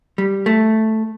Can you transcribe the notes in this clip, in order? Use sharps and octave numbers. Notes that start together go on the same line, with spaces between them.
G3
A3